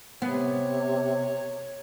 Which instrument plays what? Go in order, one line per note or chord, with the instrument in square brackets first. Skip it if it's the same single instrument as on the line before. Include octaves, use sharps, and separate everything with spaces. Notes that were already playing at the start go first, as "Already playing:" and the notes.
[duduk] C3 [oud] B3 [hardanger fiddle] C#5